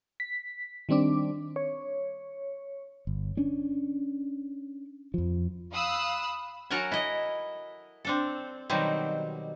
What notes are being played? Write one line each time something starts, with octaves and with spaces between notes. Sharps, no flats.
B6
D#3 G3 C4 D4 D6
C#5
G1
C#4 D4
F2 F3
F5 B5 D#6 E6 F#6
F#3 F#4 A4 A#4 F#5 G#5
E4 D#5
C4 D4 A4
B2 D#3 F#3 G3 C4